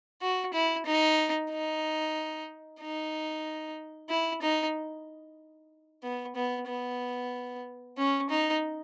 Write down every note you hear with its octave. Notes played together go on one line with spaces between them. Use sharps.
F#4
E4
D#4
D#4
D#4
E4
D#4
B3
B3
B3
C#4
D#4